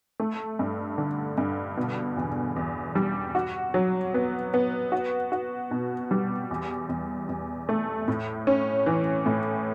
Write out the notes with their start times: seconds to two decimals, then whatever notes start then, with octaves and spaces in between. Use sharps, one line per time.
0.20 A3
0.59 G2
0.98 D3
1.38 G2
1.77 B2
2.17 E2
2.56 E2
2.95 G3
3.35 F#4
3.74 F#3
4.14 B3
4.54 B3
4.92 F#4
5.32 F#4
5.71 B2
6.11 G3
6.51 E2
6.89 E2
7.29 E2
7.69 A3
8.08 A2
8.47 C#4
8.86 E3
9.26 A2